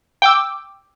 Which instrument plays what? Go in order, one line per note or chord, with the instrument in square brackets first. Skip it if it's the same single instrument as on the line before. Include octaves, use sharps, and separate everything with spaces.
[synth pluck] G5 D6 E6